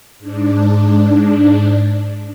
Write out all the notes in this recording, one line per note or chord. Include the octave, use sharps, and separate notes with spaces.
G#2 D4